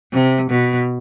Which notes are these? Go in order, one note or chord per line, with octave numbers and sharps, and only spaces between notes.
C3
B2